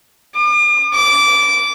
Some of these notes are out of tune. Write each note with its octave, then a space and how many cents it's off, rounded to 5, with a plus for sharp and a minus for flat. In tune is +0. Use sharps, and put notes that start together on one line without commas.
D6 +45
D6 -15